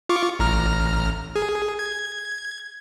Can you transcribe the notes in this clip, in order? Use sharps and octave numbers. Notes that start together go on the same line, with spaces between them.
F4 C#6 D6
A1 A#5 F6
G#4
G#6